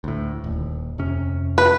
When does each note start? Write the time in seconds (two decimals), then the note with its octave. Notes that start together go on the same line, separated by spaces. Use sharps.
0.04 D2 A2
0.44 D#1 D#2
0.98 F2 C3 C#4
1.58 B4